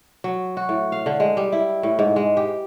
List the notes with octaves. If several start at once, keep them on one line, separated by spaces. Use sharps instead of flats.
F#3
F#4
A2
F5
D3
G#3
G3
E4
A2
G#2
G#3
G4